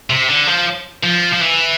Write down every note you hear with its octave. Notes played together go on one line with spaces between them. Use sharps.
C3
D3
F3
F3
F3
E3